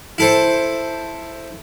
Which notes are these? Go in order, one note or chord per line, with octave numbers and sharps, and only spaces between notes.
E4 A4 C5